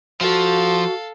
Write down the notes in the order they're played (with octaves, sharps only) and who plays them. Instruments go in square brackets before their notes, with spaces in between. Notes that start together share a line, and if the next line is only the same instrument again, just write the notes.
[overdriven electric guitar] F3 [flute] F#4 [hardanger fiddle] A4 F5